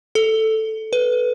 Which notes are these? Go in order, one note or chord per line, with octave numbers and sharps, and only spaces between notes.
A4
B4